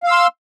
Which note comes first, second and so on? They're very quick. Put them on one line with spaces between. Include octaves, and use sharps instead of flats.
F5 E6 C6